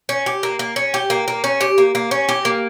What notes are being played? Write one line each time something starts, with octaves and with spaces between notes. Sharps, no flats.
C#4
G4
A#3
A#3
C#4
G4
A#3
A#3
C#4
G4
A#3
A#3
C#4
G4
A#3